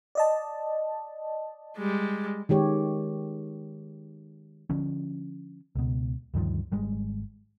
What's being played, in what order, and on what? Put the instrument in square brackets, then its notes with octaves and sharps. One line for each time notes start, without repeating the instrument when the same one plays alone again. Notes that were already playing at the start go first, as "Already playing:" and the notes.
[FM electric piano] D5 D#5 A5
[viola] G3 G#3
[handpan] D#3 G#3 G4 C#5
[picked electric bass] D3 F3 C#4
C#2 B2
D2 G2 D#3 F3
G#1 G3 G#3